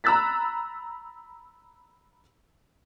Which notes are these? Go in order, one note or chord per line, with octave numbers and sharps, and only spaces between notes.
A#5 B5 E6 F#6 A6 B6